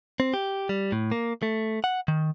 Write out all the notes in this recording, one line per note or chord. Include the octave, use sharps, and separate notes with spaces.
C4
G4
G3
A2
A#3
A3
F#5
D#3